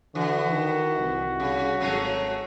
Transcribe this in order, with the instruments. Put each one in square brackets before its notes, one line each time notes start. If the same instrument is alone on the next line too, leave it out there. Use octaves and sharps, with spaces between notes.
[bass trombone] D3 [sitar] E3 [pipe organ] F#4
[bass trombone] D#3
C2
[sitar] C#3
[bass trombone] G#1 [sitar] F#3 A3 C#4